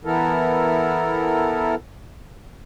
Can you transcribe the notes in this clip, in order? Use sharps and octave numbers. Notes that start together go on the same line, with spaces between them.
E3 B3 E4 A4 A#4